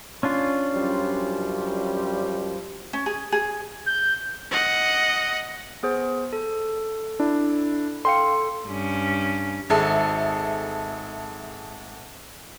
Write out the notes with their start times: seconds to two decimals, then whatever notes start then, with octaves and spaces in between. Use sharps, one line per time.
0.23 C#4 D4 F4
0.75 F#2 F3 G3
2.93 C#4
3.06 G#4
3.32 G#4
3.86 G6
4.51 D#5 F#5
5.83 B3 G#4 C5
6.33 A4
7.20 D4 E4
8.05 A4 F5 G5 C6 C#7
8.67 G2 C#4
9.70 G#1 G#4 A4 E5